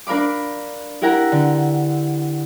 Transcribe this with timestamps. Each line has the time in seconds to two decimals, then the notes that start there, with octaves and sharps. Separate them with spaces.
0.07 D4 A#4 F5 B5 D6
1.02 E4 G4 A#4 F#5 A#5
1.32 D3